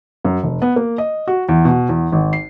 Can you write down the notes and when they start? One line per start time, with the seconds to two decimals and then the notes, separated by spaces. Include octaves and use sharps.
0.25 F#2
0.43 F1
0.62 B3
0.76 A#3
0.98 D#5
1.27 F#4
1.49 E2
1.65 B2
1.89 E2
2.12 G#1
2.33 C7